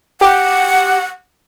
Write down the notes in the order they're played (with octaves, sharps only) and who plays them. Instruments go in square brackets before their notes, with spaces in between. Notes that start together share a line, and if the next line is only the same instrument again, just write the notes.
[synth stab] G4 [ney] F#5